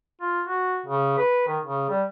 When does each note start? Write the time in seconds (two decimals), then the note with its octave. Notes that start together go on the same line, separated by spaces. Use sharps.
0.21 F4
0.48 F#4
0.86 C#3
1.18 B4
1.48 D#3
1.65 C#3
1.90 G3